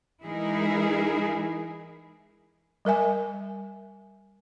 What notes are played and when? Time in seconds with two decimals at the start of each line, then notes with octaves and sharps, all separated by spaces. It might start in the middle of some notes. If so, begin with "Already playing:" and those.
0.24 E3 G#3 D#4 E4 G#4 A#4
2.85 G3 A#4 E5 G#5